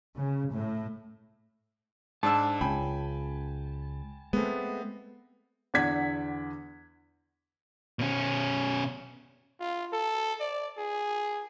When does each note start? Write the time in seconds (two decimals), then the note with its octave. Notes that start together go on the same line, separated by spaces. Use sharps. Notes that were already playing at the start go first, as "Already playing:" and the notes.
0.17 C#3
0.53 A2
2.23 G#2 D4 A5 E6
2.61 C#2 C#3 G5 G#5 B5
4.33 G#3 A3 B3 C4
5.74 E2 D3 D5 F#5 G#6 B6
7.99 B2 C#4
9.60 F4
9.92 A4
10.40 D5
10.78 G#4